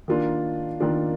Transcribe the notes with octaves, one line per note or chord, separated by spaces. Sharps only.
D#3 A#3 D4 F4
D#3 A#3 D4 F4